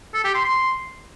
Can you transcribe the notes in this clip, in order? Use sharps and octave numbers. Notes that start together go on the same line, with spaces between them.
A4
G4
C6
C6